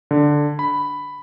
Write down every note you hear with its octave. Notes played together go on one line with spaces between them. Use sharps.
D3
B5